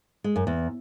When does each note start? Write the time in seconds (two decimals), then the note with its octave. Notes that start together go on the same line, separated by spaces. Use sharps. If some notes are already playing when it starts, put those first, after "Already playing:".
0.24 G#3
0.36 F#2
0.47 E2